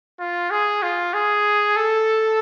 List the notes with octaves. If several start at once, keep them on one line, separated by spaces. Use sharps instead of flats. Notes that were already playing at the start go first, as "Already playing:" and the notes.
F4
G#4
F4
G#4
A4